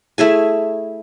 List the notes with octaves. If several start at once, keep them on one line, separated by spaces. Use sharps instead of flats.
A3 E4 G#4 G#5